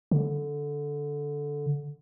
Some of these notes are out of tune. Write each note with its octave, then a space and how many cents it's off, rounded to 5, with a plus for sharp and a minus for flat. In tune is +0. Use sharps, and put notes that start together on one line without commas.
D3 -10